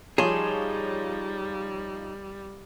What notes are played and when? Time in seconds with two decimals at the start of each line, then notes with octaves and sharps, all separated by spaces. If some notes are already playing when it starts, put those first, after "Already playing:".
0.18 F3 G3 D#4 G#4 C#5 A5 C6